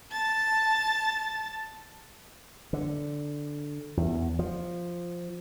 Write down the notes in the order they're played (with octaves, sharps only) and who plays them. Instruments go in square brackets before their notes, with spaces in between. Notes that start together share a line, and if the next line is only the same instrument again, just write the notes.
[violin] A5 A6
[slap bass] D3
E2
F3